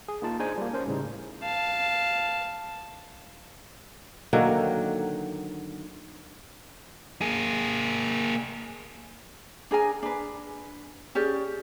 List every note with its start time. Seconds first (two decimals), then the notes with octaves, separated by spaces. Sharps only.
0.08 G#4
0.22 A#3 D#4 F4 A5
0.39 D4 D#4 G#4 C5 G#5
0.58 G3 A#3
0.73 C#4 A#4 C5
0.87 A2 C#3 G3 D#4
1.43 F5 A5
4.33 D3 D#3 F#3 A#3
7.21 A#3 G#4
9.71 D4 G#4 A#4 G#5
10.03 D4 B4
11.15 C#4 G4 G#4 D5